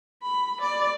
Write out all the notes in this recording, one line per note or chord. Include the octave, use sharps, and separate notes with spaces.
B5
D5